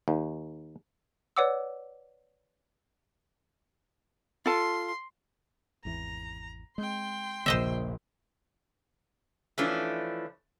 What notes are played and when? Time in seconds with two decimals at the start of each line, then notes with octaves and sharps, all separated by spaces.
0.08 D#2
1.37 B4 C#5 D5 F#5 D6 E6
4.46 F4 A4 A5 C6
5.85 G#1 E2 E3 A#5
6.78 G#3 C4 G5 C6
7.46 D#1 A#1 C#3 F3 A#3 C5 D#5 E5
9.58 E3 F3 A3 C#4 D4